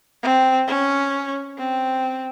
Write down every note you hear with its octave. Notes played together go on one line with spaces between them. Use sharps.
C4
C#4
C4